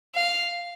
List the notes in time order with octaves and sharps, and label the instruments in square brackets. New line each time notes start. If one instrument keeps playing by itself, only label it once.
[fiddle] F5